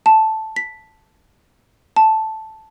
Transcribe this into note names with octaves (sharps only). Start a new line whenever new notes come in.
A5
B6
A5